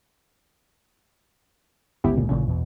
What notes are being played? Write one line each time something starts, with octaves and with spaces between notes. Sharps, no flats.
G1 C#2 B3 E4 G4
A#2
A1 A#2 C#3 E3 F#3
E2 B2